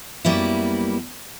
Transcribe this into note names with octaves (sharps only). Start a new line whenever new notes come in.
F#2 G3 A#3 B3 E4